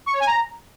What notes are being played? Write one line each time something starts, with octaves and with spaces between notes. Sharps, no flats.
C#6
C#5
G#5
A#5